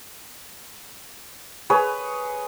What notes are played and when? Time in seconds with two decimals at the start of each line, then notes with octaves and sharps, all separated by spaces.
1.70 G#4 B4 C#5